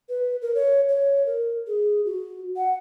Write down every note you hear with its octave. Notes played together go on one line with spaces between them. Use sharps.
B4
A#4
C#5
C#5
A#4
G#4
F#4
F#5